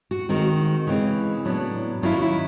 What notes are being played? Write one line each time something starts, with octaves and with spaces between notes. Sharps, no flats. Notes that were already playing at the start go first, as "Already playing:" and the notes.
F#4
D#3 G#3 C4 F#4
C#3 E3 G#3 C4
A2 F#3 B3 D4
D#3 F#3 A#3 C#4 E4 F4
E4